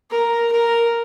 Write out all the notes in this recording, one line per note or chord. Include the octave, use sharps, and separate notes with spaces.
A#4
A#4